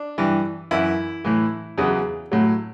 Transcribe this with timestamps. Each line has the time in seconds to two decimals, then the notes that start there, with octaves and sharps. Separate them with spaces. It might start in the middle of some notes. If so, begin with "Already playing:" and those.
Already playing: D4
0.18 G2 E3
0.71 F#2 E3 E4
1.25 A2 E3
1.78 E2 C#3 F#3
2.32 A2 F#3